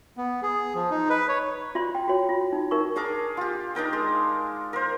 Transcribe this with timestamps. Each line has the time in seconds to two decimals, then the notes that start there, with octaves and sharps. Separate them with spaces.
0.17 B3
0.42 G#4
0.75 F3
0.91 D#4
1.09 B4
1.29 C#5
1.75 F4 D5 C6
1.95 G5
2.08 F#4 C#5
2.29 F4
2.53 D#4
2.71 D#4 A#4 C#6
2.96 D4 G#4 A#4 D6
3.37 F4 G4
3.75 D4 D#4 A#4 G5
3.93 G#3
4.73 A#4 C5